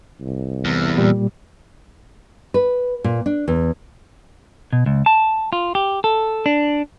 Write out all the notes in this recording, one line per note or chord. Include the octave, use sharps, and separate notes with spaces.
C2
E2
A#2 G3
B4
A#2
D4
E2
B2
C#2
A5
F4
G4
A4
D4